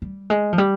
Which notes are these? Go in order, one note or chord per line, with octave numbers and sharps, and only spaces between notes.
G3
G#3
F3
G3